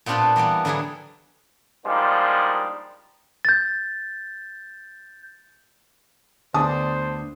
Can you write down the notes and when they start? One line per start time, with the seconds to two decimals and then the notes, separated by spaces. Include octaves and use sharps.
0.06 A#2 B3 C4 D4 F4 G4
0.36 E3 G3 A#3 B3
0.65 D3 F#3 G3 E4 G#4
1.86 F3 G3 G#3 A#3 D4 D#4
3.45 G6 A6
6.54 D2 D3 B3 D4 C5 A5 D#6